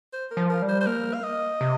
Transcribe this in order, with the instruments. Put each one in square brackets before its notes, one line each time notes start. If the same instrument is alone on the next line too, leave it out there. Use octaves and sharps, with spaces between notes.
[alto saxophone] C5
A#4
[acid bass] F3
[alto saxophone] A#4
[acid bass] G3
[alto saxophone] C5
C5
[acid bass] A#3 [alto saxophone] A#4
[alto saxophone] F5
D#5
[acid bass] C3